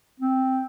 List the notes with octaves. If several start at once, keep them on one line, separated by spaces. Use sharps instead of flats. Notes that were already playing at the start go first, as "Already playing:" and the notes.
C4